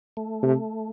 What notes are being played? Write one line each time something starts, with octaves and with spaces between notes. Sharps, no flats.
A3
C3